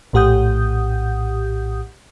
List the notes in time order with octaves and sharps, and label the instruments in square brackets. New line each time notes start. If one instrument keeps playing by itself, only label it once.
[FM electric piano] A#1 A2 G4 F#5 D#6 G6